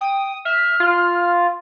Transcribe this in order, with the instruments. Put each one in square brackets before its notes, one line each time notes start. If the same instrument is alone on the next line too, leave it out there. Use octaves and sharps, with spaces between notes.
[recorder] G5 [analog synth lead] D#6
[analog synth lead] E5 [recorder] F6
[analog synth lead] F4